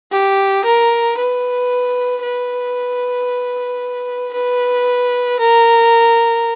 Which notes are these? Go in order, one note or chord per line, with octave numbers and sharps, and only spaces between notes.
G4
A#4
B4
B4
B4
A#4